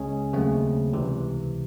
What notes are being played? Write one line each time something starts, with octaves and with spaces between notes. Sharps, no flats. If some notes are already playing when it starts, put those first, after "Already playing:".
Already playing: C#2 C#3 G#3 C#4 G#4
D#2 C#3 F#3 A3 C4
C#2 C3 E3